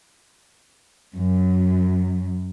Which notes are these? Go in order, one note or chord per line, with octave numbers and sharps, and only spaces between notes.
F#2